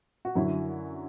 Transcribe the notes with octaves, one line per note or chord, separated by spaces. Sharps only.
F#4
F#2 D3 F#3 E4